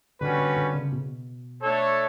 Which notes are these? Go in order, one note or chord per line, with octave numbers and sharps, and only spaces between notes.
D3 G3 C#4 F#4 B4
D3
D3
C#3
B2
A3 D4 A4 C#5